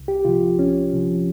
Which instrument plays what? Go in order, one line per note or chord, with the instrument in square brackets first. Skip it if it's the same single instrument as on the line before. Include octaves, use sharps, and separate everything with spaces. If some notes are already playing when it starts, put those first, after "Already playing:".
Already playing: [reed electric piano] C2
G4
C3 F3 F4
C2 C#4
C3 F3